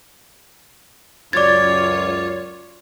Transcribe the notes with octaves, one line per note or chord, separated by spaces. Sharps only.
C#2 F#2 F4 C#5 D5 D6 G#6 A6